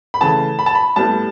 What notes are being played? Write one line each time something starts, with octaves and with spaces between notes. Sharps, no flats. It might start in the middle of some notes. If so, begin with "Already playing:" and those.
B5
C#3 E3 A3 A5
B5
A5
B5
A2 G3 B3 A5